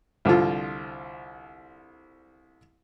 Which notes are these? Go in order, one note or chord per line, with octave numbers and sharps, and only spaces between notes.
C2 D3 F3 F4